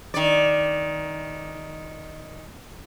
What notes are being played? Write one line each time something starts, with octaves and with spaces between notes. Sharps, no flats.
D#3 D5